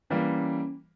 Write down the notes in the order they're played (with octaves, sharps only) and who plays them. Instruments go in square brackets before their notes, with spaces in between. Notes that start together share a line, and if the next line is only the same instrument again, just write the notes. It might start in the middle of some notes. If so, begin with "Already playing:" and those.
[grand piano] E3 G3 A#3 [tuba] C#4